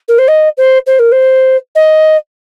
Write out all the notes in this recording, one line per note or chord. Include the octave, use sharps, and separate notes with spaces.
A#4
C5
D#5
C5
C5
A#4
C5
D#5